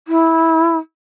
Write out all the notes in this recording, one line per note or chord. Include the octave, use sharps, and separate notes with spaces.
E4